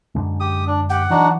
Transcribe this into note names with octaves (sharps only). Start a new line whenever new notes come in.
F#2 D3 G#3
G4 D#6
D4
G4 F#5 G5
E3 F#3 D4 D#4 F#4